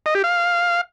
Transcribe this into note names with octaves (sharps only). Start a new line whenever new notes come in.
D#5
G4
F5